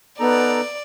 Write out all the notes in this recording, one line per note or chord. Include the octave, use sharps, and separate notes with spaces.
B3 D#4 A4 D5 A#5